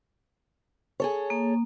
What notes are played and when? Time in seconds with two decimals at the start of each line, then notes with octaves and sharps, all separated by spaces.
1.00 G#4 A4 C#5
1.30 A#3